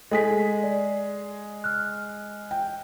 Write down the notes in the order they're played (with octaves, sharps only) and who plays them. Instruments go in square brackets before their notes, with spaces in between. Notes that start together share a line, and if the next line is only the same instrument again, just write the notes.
[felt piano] G#3 G#4 B6 [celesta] A4
[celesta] D5
F6 F#6
[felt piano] G5